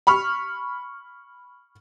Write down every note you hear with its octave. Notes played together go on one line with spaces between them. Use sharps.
B5 C#6 F6